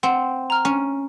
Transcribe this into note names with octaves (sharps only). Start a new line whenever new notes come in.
C4 F#5
A#5 F6
C#4